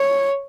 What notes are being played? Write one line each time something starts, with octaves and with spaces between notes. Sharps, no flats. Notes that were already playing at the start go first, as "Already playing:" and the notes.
Already playing: C#5